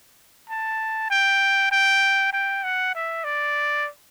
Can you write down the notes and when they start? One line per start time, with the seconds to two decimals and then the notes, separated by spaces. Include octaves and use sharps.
0.49 A5
1.10 G5
1.71 G5
2.33 G5
2.64 F#5
2.95 E5
3.24 D5